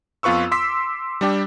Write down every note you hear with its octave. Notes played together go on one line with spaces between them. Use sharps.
F2 B3 F4 B4 C#6 E6
C6 D6 E6 B6
G3 D4 G4